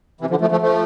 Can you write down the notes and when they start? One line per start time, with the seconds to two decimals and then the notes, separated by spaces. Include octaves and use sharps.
0.21 C3 E3
0.30 D3 F3
0.41 F3 A3
0.51 F3 A3
0.62 F3 A3